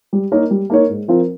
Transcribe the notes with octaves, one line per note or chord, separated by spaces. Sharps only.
G3
A#3 D#4 A#4 C#5
G3
A#3 D#4 A#4 C#5
G#2
F3 C4 F4 A#4